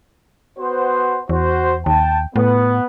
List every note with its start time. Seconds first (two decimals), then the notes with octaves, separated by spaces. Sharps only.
0.59 B3 F#4 C5
1.29 E2 F#4 C5
1.86 D#2 G5 A5
2.36 A2 B3